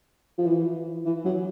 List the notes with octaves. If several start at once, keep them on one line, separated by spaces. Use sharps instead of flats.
F3
E3
E3
F#3